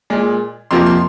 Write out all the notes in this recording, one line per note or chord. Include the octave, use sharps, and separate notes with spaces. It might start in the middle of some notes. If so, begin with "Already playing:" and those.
A#2 G#3
F2 C3 F3 A#3 C6
C6